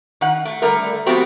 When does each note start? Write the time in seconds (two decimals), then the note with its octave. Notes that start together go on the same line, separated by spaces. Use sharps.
0.21 D#3 F#5
0.45 A3
0.62 D3 G3 A3 A#4
1.06 F3 A3 B3 C4 F#4 G4